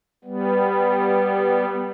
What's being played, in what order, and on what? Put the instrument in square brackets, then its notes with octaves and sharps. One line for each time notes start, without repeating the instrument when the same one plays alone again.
[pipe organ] G3 B3